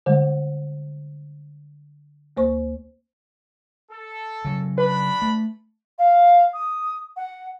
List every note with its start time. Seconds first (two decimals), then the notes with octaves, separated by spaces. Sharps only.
0.06 D3 G3 G#3
2.37 D2 A#3 C5 C#6
3.89 A4
4.45 C#3 F#3
4.78 D4 B4 B5
5.22 A3
5.99 F5
6.54 D#6
7.17 F#5